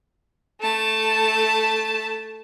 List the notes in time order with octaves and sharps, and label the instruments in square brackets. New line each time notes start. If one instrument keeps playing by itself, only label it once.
[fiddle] A3 A5